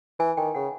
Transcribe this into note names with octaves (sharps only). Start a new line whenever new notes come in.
E3 G#5
D#3 G5
C#3 F#5